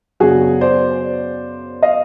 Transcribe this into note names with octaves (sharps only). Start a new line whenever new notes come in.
F#2 C#3 F#3 B3 D4 F#4 G#4
C5 D5
D#5 F5